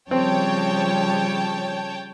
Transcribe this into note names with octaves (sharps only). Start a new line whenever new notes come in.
C#3 F3 G3 C4 C#5 G5 A5